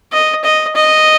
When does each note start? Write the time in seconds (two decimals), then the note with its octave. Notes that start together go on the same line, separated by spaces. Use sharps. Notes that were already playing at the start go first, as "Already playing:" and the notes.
0.12 D#5
0.44 D#5
0.75 D#5